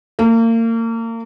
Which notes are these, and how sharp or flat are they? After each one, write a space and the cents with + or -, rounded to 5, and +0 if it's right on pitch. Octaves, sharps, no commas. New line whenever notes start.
A#3 -35